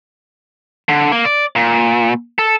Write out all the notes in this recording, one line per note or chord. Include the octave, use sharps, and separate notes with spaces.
D3
A#3
D5
A#2
A4